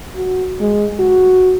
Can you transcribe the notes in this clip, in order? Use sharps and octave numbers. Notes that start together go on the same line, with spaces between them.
F#4
G#3
F#4